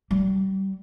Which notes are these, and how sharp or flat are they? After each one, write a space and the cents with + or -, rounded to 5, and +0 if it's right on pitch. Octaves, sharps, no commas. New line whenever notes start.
G3 -30